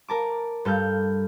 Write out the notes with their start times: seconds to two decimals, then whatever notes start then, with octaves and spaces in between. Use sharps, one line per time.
0.08 A#4 A5 D6
0.65 G2 A4 F6 G6